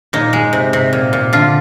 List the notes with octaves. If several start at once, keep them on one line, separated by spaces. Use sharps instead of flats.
A#2 D#4
G#3
C3
C3
A#2
A#2
D3 F4